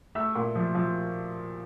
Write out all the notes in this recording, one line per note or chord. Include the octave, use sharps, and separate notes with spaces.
A3 E5 E6
A#2
F3
F3